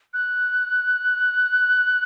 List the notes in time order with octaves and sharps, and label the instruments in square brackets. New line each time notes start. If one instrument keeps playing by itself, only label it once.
[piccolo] F#6